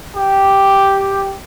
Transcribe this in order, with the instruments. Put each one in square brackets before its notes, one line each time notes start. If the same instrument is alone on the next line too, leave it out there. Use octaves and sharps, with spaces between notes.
[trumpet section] G4